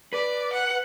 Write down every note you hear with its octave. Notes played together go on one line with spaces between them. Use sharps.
B4 D5
F#5